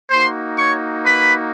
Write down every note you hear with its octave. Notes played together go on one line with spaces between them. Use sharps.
A#3 D#4 F#4 C5 C6
C#5 C#6
B4 B5